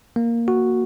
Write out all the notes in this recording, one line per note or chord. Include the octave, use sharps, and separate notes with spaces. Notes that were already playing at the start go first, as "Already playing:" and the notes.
A#3
F#4